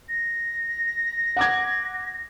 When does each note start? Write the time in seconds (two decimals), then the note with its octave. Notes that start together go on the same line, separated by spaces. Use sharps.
0.09 A#6
1.37 F#5 D6 G#6